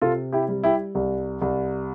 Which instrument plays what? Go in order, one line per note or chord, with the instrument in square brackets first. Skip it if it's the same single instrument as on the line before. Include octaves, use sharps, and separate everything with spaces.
[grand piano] C3 F4 A4
E4 G4
G3
E4 G4
C2
C2